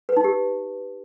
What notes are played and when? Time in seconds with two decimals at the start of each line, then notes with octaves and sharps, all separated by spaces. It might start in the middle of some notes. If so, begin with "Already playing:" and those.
0.09 B4
0.17 D#4
0.24 G4